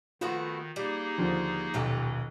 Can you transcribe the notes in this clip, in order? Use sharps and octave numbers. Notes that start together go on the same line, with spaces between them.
D#3 A3 B3 F4 F#4
G3 A#3 D#4 G#4
D#2 D3 F3
D#1 B1 F4 G4 A4